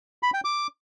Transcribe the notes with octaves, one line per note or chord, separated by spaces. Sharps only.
B5
G5
D6